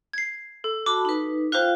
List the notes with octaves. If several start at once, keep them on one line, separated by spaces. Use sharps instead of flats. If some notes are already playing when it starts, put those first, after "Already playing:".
G#6 C7
A4
F#4 A5 B5 D6
D#4 B4
F4 C5 F5 G5 F#6